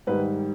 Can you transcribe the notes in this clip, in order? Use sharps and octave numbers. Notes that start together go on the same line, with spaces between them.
G#2 D#3 G3 B4